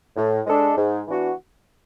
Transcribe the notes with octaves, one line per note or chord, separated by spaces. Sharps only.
A2
G#3 D4 A4
G#2
E3 B3 D4 F#4